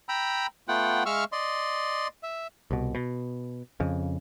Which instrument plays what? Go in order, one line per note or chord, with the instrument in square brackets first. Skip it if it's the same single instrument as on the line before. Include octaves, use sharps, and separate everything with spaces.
[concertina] G5 A#5 B5 E6
A3 B3 F4 F#5 G5
G#3 E5 F5 C#6 E6 F6
D5 D#5 C6
E5
[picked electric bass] C2 B2
B2
F2 C#3